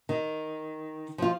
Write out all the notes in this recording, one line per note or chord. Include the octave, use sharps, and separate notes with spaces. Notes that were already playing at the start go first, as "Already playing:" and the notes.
D#3
F3 F4